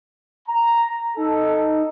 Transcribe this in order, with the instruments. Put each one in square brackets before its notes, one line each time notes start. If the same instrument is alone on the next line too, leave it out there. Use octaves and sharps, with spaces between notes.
[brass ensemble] A#5
[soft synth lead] D#4 [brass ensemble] A4